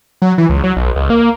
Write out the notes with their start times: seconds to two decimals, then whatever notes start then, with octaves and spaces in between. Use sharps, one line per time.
0.22 F#3
0.38 E3
0.50 C#2
0.64 F#3
0.77 B1
0.96 C#2
1.10 A#3